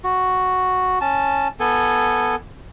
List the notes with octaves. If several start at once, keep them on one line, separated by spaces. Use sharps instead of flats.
F#4
C#4 A5
B3 A4 G#5